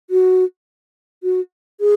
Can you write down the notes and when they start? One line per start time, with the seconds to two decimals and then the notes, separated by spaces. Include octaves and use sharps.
0.10 F#4
1.23 F#4
1.81 G#4